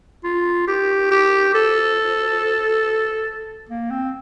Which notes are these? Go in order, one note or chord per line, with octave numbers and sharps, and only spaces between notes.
F4
G4
G4
A4
A#3
C4